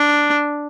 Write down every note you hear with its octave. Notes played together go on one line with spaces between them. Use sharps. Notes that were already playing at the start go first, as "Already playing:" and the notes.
Already playing: D4